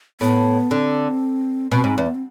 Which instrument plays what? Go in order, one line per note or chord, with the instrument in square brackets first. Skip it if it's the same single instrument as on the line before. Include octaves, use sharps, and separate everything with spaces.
[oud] A2 [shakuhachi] B3
[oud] D3 [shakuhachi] C4
[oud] B2 [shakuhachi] C4
[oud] G#2
E2
[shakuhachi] B3
C4